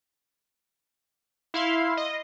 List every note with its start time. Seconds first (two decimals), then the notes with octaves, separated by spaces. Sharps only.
1.54 E4 F5 C6
1.97 D#5